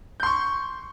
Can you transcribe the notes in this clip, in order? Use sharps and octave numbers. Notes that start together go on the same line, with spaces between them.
C6 C#6 G6